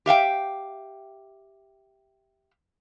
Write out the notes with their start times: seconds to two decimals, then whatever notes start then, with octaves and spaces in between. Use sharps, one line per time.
0.06 G4 E5 F5 G5